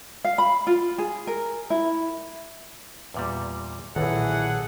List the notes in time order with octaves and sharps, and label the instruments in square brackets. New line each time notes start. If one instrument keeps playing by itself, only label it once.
[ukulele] F5
B5
F4
G#4
A#4
E4
[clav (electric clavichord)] E2 A#2 G3
[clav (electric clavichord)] B1 [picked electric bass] A#2 D#3 [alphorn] E3 [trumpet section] G#4 A4 F#5